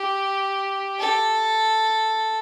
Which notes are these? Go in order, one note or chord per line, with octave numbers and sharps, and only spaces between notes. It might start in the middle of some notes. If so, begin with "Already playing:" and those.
Already playing: G4
A4